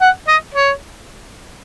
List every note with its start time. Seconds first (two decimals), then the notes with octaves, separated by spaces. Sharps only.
0.01 F#5
0.28 D#5
0.54 C#5